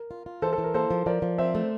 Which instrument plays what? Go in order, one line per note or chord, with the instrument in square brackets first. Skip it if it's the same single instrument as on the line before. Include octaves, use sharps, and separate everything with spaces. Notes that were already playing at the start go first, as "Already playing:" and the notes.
Already playing: [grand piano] A#4
[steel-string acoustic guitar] F4
F4
[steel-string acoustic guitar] E3 [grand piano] A4 C5
[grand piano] A4
[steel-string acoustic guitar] E3
[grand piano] A#4
[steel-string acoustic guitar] A#3 [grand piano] A4 C5
[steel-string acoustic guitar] F3
[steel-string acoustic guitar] F3 [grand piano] A#4 D5
[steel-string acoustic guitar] F3
[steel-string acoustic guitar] C4 [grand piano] C5 E5
[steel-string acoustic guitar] A3